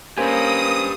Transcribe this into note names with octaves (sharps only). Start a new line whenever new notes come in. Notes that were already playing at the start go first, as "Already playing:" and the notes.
A#3 C#4 G4 B4 C5 G#5 D#6